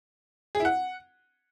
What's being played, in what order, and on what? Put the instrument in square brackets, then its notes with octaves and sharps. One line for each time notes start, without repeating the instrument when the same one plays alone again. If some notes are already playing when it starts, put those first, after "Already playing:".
[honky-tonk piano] G#4
E4
F#5